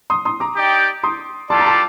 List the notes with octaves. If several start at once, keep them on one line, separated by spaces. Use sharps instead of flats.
C6 D#6
C6 D#6
A#5 D6
D#4 G4 D5 G5
C6 D#6
G3 D4 F4 A4 D5 A5 C6
A#5
A5 C6